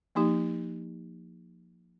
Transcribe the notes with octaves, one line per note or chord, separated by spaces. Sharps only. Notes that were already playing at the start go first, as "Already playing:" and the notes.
F3 A#3 D#4 G4